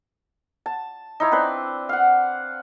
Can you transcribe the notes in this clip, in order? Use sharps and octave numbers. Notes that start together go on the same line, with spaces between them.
A5
D#4 E4 C#5
C4 D4 B4 C5
F5 F#5